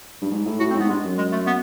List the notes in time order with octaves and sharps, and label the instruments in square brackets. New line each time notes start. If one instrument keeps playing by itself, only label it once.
[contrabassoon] G2
G#2
A2
[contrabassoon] A2 [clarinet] F#4
[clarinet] C4
[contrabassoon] G#2 [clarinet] B3
[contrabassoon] G2 [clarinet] G#3
[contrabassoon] F#2
[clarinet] G#3
A3
B3